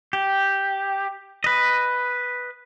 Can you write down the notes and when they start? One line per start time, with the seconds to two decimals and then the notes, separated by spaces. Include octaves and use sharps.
0.13 G4
1.44 B4 D#5